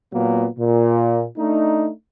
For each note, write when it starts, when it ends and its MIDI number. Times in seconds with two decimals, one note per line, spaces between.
0.13 0.48 46
0.13 0.48 54
0.13 0.48 58
0.13 0.48 59
0.59 1.26 46
1.38 1.90 57
1.38 1.90 62
1.38 1.90 63